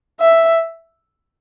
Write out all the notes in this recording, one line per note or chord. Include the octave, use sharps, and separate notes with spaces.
E5